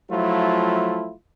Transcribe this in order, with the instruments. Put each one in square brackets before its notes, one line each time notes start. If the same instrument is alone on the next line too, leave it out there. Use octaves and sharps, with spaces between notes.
[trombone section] F3 F#3 A3 E4 F4